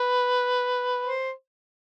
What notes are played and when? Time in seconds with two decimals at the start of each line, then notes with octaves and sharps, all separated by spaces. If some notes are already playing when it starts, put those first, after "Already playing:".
Already playing: B4
1.06 C5